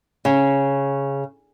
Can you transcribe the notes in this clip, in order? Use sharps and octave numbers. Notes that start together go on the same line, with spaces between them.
C#3